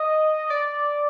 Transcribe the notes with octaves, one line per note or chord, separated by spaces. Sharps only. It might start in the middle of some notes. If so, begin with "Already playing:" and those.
Already playing: D#5
D5